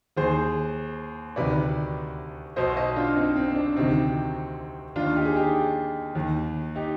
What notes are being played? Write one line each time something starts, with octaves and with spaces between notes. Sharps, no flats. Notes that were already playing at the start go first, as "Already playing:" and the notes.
D#2 D#3 G#4 C5
D2 C3 D#3 B4 D5
B1 B2 C5 D#5
C5 D#5
D4 F4
C4 D#4
C4
C4
D4
D2 C3 D#3 C4 D#4
D#2 D#3 D4 F4
D#4 G4
G#4
D#4 G4
D#2 D#3
D#4 G4